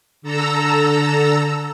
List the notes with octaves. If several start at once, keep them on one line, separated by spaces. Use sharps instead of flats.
D3 A4 A#5 E6